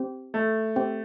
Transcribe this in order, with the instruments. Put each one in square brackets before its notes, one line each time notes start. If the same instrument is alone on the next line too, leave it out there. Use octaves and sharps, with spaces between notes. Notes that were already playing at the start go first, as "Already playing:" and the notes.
Already playing: [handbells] C4 G4 C5
[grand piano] A3
[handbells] C4 G4 C5 G5